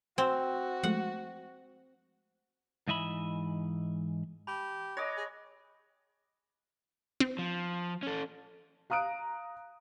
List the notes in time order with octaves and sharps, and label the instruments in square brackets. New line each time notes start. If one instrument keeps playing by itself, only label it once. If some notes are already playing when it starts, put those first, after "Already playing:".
[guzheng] C4 [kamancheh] F#4 [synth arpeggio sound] G#5 E6
[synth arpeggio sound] F3 G#3 A3 [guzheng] F#5
[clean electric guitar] G#2 E3 D#5 E5 B5
[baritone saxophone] G4 [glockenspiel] A5 B5
[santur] C#5 D#5 D6 [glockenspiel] F#6 A#6
[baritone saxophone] G#4
[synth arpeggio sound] C4
[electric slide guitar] F3
C#4 A4
[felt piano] F5 A#5 D#6 F#6 D7